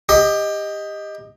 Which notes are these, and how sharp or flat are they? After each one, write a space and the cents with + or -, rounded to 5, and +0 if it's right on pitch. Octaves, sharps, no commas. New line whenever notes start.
G4 +25 D#5 +0